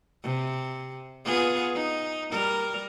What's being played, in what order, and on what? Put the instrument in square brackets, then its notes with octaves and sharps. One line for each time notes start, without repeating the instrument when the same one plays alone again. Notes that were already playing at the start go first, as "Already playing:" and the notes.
[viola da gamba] C3
B3 F4 G#4
D#4
G3 A#4